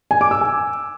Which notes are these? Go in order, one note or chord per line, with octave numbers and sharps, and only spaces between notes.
G#5
D6
E6
G#5